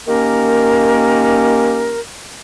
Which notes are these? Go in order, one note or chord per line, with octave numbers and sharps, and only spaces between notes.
D#3 A#3 C#4 G4 A#4